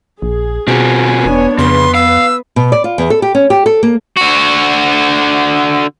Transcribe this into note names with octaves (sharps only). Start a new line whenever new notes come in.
A#1 G#4
B2 C4 F4 F#4 G#5
E1 B3 D4 C#5
F2 C#3 B3 B4 C6
F5 E6
B2
D5
F4
E2
A4
G4
C#4
G4
A4
A#3
D3 F#4